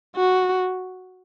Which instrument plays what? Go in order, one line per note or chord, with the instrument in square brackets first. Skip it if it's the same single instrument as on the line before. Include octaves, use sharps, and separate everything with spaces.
[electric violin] F#4